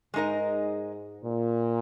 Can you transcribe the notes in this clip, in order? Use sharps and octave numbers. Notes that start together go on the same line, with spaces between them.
G#2 G#3 D#4 A#4 D#5
A#2